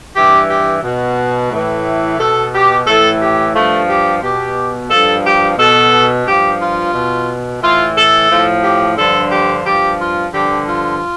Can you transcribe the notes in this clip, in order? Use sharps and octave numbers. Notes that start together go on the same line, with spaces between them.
G2 E3 G4
G4
B2
A2 E3
B2 A4
G4
A2 E3 A4
G4
G2 F3 A3
G4
B2 G4
G2 F3 A4
G4
B2 A4
G2 F3 G4
F4
B2
A2 E3 F4
A4
A2 F3
G4
G2 D3 F3 A4
G4
G2 F3 G4
F4
G2 D3 F3 G4
F4